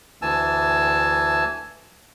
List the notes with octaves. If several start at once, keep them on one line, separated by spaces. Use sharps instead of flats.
D2 E3 G#5 A5 E6